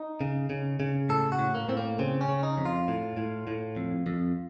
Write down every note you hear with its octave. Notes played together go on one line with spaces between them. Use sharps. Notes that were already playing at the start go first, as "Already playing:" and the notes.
Already playing: D#4
C#3
C#3
C#3
A2 A4
F#4
A2
A#3
A2 C4
A#3
C#3 C4
C#4
C#3
D#4
F2
F4
A2
A2
A2
F2
F2